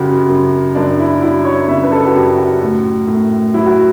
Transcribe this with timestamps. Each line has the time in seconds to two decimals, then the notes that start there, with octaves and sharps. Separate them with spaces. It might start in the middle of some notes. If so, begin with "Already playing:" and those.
Already playing: F#2 C#3 F#3 F#4 G4
0.29 F#2
0.75 F#2 D4
0.99 E4
1.22 F#3 E4
1.45 C#5
1.68 C#3 E5
1.83 B4
1.92 A4
2.06 F#4
2.15 F#2 G4
2.38 F#4
2.62 A2
3.07 A2
3.54 F#3 E4
3.66 F#4